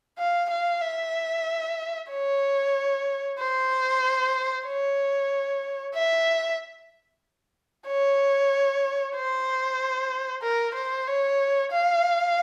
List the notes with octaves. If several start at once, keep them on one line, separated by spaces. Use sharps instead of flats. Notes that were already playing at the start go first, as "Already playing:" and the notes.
F5
F5
E5
C#5
C5
C#5
E5
C#5
C5
A#4
C5
C#5
F5